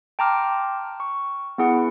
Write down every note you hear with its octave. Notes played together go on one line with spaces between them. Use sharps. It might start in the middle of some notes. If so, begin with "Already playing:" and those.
G5 A5 A#5 C6 D6 F6
C#6
B3 E4 G#4 F#5